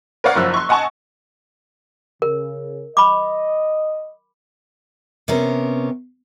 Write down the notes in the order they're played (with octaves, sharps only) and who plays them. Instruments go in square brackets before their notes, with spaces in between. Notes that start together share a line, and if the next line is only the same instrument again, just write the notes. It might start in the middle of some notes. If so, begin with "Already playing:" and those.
[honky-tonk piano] A#4 B4 C#5 D5 F5 F#5
F#1 F#2 F3 E6 F#6
C6 C#6
D#5 F#5 G#5 A5 C#6
[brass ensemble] C#3 [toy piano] A#4
[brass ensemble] D#5 [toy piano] B5 D6
[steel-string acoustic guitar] C3 B3 C#4 A#4